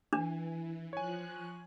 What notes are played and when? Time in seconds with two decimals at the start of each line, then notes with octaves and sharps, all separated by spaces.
0.13 E3 D4 G#5
0.93 F3 C#5 G#5 F#6